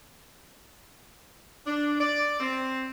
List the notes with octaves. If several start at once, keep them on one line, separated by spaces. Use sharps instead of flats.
D4
D5
C4